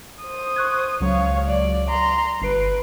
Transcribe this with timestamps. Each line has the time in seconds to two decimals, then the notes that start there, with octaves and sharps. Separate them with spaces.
0.23 C5 D#6
0.56 C#6 F#6 G#6
1.00 C#2 F#3 C#5 F5
1.46 D5
1.89 A#5 C6
2.41 G1 B4 C7 D7